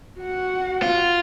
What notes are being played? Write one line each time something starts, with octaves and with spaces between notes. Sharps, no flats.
F#4 F#5
F4